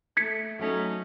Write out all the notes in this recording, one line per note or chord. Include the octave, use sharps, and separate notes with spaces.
A3 G#6 B6 C#7
F#3 A3 C#4 D#4